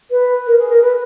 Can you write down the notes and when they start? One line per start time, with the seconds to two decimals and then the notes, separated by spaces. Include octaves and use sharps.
0.10 B4
0.46 A#4
0.58 G#4
0.69 A#4
0.81 B4